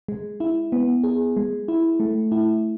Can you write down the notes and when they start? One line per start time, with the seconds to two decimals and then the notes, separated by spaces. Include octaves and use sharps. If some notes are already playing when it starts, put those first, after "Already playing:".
0.08 G#3
0.40 E4
0.72 B3
1.04 G#4
1.37 G#3
1.68 E4
2.00 A3
2.32 E4